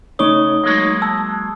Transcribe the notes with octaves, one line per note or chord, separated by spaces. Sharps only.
C#3 A3 D#4 C#5 D#6 G7
F#3 G#3 A#3
A5 E6